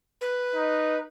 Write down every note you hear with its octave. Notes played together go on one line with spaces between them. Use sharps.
B4
D#4